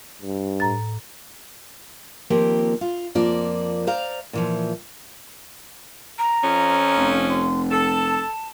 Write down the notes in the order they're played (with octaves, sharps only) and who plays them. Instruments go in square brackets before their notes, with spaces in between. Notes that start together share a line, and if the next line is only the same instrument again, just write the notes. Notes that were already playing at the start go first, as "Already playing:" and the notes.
[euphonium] G2
[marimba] A2 A#5 A6
[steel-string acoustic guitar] D#2 F3 A#3 C4 G4
F4
F2 F3 A#3 D5 A5
C5 D5 F5 A#5
A#2 E3 F3
[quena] A#5
[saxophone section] F2 F3 C#4
[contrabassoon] F1
[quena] C6
[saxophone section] A4 [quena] A5